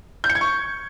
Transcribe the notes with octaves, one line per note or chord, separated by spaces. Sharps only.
G6
C#7
G#6
C#6